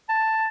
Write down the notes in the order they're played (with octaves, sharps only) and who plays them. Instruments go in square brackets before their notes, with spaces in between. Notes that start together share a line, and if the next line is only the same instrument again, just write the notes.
[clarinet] A5